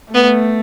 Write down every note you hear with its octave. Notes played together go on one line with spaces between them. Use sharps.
A3 B3